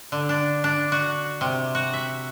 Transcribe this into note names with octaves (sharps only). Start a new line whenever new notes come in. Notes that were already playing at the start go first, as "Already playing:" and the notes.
D3
D4
D4
F#4
C3
F#4
E5